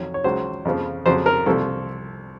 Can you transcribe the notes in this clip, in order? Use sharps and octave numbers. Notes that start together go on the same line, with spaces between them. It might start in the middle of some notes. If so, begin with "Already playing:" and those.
Already playing: F2 D#3 F#3 C#5
C#5
C#2 C#3 F#3 C5
F2 C#3 F3
F2 C#3 F#3 C5
A#4
C2 C3 F3 A4